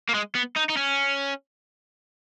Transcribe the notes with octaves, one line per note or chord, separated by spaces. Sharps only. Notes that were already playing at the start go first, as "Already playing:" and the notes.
A#3
G#3
B3
D#4
D#4
C#4